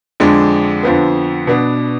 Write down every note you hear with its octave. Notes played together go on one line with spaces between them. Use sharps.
F2 D3 G#3 D4
F2 D3 F3 B3
B2 B3 D4